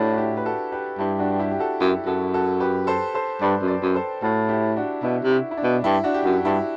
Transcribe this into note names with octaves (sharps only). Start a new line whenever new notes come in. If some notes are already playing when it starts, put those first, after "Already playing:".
Already playing: A2 D4 E4 F#4 G4
F#4
E4 G4
B4
F#4 A4
G4 B4
G2 E4 G4
D4 F#4
E4 G4
G4
F#4 A4
F#2 E4 G4
F#2 F#4 A4
F#4 A4
G4 B4
A4 C5
A4 C5
G2 B4 D5
F#2
B4 D5
F#2
A4 C5
A2 F#4 A4
E4 G4
D4 F#4
B2 E4
C3
E4
E4
D4
B2
G2 E4
D4 F#4
G4
F#2 D4 F#4
G2 E4 G4